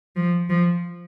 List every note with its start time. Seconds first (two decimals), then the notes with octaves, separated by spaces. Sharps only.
0.16 F3
0.50 F3